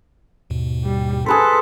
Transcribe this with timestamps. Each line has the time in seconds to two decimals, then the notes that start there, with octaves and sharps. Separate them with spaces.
0.50 D#2 G#2 B2
0.85 G3
1.26 G#4 A4 B4 C5 F#6 B6